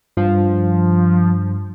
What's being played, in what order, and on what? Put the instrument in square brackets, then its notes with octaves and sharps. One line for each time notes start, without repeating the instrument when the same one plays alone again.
[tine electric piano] G2 [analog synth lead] F3